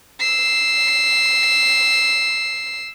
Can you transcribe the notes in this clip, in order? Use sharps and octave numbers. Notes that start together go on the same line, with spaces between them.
E6 C7